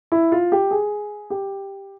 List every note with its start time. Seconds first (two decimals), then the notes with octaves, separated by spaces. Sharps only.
0.12 E4
0.32 F4
0.52 G4
0.71 G#4
1.30 G4